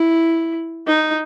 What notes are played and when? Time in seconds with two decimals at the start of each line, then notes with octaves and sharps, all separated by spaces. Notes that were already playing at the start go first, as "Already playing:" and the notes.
Already playing: E4
0.88 D#4